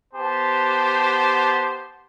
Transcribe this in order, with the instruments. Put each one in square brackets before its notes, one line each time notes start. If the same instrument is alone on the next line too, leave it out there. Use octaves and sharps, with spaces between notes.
[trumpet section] B3 G4 C5 A5